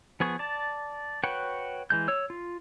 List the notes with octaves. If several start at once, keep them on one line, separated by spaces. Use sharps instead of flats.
F3 B3 G#4 C#6
D5 A5
F#4 B4 C#5 F#5 G5
E3 G#3 G6
C#5 E6
F4